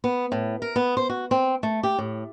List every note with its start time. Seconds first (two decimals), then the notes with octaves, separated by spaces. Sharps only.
0.04 B3
0.32 A2
0.62 A#4
0.76 B3
0.97 C5
1.09 F#4
1.31 C4
1.63 A3
1.83 G4
1.98 A2